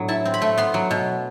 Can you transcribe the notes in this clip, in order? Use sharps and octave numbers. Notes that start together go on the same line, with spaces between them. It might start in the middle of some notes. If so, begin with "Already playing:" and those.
Already playing: A2 F#3 B3 D4
E4 A5
C4
B5
A3
B3 C6
F#3
B2